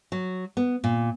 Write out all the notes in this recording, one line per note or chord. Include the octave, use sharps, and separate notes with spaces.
F#3
B3
A#2